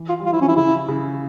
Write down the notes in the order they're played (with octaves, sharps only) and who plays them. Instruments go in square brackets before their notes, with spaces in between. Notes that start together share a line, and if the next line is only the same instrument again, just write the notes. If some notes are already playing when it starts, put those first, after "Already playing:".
Already playing: [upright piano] E3
[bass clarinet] F4
[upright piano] G3
[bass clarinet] F4
[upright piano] F3 [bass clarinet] E4
[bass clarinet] C#4
[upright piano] E3 [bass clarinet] E4
[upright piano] C#3 [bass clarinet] E4
[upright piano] C#3